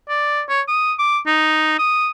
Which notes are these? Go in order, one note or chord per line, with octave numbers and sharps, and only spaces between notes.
D5
C#5
D#6
D6
D#4
D#6